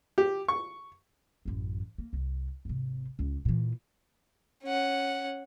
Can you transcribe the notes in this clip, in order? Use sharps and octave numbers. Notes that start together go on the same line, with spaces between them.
G4
C#6
A1 F#2
A#3
C2
G#1 C3
C#2
A#2 E3
C#4 F#5